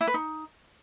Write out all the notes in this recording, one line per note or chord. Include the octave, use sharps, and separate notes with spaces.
E4
B4
D#4